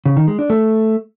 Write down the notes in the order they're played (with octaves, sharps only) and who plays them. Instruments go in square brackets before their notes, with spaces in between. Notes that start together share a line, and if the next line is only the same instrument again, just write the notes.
[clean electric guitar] C#3
D#3
G#3
D4
A3